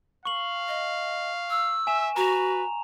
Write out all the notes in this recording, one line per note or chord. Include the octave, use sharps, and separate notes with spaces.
F5 C#6 F#7
D#5
E6
E5 G#5 E7
F#4 B4 A#5 F7